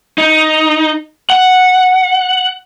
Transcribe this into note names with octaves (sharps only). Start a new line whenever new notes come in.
D#4
F#5